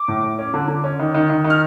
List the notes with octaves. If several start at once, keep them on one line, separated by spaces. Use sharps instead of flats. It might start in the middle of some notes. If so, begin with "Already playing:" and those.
Already playing: D6
A2
A2
C#4
D3
D3
C#4
D#3
D#3
D#3
D#3
F6